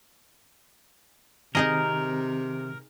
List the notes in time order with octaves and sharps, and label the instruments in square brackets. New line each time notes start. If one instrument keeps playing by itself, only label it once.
[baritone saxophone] C3 [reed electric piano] D#3 C4 [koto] D#4 G#4 D#5 [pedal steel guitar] A#4